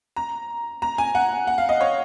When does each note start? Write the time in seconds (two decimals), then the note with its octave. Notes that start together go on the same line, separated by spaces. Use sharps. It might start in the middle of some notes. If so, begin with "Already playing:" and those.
0.16 A#5
0.82 A#5
0.98 G#5
1.15 F#5
1.47 F#5
1.58 F5
1.69 D#5
1.81 C#5